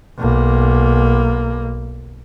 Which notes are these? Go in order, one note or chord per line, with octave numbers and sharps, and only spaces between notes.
B1 A#3